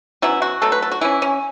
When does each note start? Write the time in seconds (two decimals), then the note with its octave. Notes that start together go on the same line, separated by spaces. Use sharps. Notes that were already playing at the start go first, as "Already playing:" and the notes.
0.22 B2 F#3 C#4 E4
0.42 F#4
0.62 B2 F#3 A3 A4
0.72 B4
0.82 A4
0.91 F#4
1.01 E3 C#4 E4
1.22 C#4